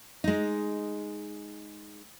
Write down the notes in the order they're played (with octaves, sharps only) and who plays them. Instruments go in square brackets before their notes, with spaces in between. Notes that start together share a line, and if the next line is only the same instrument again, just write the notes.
[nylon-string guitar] G#3 D#4